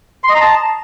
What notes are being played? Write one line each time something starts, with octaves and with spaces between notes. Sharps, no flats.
C6
D#5
A#5
A5